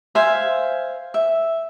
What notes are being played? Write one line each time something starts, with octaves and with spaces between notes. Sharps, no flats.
C5 E5 F5 G#5
E5